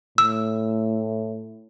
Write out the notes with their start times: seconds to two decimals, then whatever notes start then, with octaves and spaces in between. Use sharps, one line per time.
0.18 A2 E6